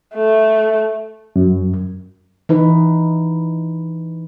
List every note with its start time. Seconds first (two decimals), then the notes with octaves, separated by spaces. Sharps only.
0.15 A3
1.36 F#2
2.49 E3 D#4 B4